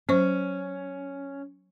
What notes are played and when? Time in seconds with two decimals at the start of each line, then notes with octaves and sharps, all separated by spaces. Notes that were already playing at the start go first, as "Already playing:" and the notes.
0.09 F#3 C#4 C5 C#6